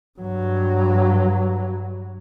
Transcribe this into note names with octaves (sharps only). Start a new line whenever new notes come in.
G2 F#3